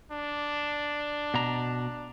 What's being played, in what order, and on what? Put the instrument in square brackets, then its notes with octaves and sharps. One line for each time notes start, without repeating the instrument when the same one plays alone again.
[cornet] D4
[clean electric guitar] B2 A#5